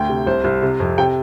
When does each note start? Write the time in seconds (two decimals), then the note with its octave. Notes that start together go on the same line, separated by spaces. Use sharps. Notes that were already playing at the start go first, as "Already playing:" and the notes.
Already playing: D2 G5
0.09 C3
0.27 C2 C5
0.44 C2
0.62 C3
0.80 F2
0.98 C3 G5